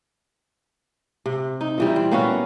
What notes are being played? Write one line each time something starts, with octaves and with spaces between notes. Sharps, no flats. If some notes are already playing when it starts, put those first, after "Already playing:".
C3
D#4
A#2 E3 G3
C4
A#3 B3 C#4 F#4